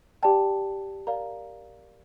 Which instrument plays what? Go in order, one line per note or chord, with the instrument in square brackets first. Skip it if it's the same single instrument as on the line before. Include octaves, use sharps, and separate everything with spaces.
[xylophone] G4 D5 G5 A5
A#4 D5 F5 A#5